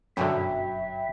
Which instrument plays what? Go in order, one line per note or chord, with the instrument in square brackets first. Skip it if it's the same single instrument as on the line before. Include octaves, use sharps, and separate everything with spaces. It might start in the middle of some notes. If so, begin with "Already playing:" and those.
[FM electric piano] G1 G5 B5 [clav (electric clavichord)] F#2 B2 D3 [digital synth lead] F#3 [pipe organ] E5